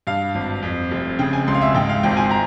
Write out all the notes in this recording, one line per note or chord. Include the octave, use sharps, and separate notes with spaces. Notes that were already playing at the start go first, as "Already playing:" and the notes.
G2 F5
G#1
F2
F1
C#3 G5
G#5
C#2 C6
F5
E5
G#2 G5
F5
G#1 G5
G#5
A#5